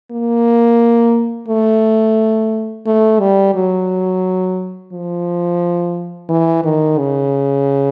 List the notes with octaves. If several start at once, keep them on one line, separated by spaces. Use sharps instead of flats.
A#3
A3
A3
G3
F#3
F3
E3
D#3
C#3